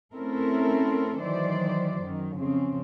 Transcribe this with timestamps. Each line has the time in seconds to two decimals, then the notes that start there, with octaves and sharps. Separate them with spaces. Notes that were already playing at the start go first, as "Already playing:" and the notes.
0.13 A3 C4 C#4 E4 A4 A#4
1.18 D#3 E3 F#3 C5 D5
2.01 F#2 D#3
2.37 F2 C#3 C4